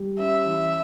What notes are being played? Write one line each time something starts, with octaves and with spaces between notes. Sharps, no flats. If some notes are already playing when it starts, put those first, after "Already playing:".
Already playing: G3
C#4 E5
E3